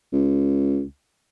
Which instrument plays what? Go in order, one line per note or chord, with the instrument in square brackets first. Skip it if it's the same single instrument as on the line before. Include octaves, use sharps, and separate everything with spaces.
[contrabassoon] C#2